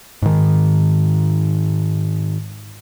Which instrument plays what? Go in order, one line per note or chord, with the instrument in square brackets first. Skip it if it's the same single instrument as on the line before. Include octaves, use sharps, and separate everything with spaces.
[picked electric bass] G#2 D#3